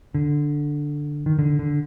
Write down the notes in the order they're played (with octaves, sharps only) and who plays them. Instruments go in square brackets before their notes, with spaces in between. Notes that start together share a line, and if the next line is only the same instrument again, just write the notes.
[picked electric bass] D3
D#3
D3
D3